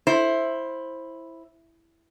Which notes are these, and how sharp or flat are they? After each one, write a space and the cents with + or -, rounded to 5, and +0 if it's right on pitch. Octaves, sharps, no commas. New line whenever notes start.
E4 +0 C5 +15